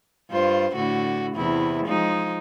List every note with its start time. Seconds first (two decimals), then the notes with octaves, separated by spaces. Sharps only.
0.30 G2 F4 C5
0.75 A2 D3 F#4
1.35 E2 C3 E4
1.86 F3 G#3 D#4